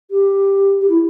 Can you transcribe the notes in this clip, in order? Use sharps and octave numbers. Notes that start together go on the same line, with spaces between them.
G4
G4
E4